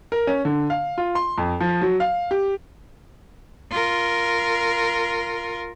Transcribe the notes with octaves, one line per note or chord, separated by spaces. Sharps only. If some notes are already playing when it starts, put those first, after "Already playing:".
A#4
C#4
D3
F5
F4
C6
F2
F3
F#3
F5
G4
F4 A#4